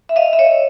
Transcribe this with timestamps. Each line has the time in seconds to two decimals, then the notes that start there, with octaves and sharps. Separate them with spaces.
0.09 E5
0.16 D#5 F5
0.33 E5
0.39 C#5 D#5